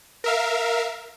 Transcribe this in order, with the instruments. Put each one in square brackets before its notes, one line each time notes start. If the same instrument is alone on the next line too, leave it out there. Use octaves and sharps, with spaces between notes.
[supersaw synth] A#4 E5 F5